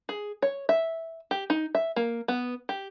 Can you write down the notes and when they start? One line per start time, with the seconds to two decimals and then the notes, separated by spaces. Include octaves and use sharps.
0.09 G#4
0.42 C#5
0.69 E5
1.31 G4
1.50 D#4
1.75 E5
1.96 A#3
2.28 B3
2.69 G4